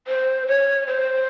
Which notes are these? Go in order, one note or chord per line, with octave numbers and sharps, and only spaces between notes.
C5
C#5
C5